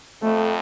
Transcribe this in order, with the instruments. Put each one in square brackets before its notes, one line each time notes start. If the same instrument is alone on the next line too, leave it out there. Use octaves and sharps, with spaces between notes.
[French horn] F2 [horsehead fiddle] A3